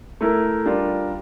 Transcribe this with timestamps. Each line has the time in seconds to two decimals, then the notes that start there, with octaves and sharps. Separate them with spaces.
0.21 A3 E4 A#4
0.65 G3 D4 F4 A#4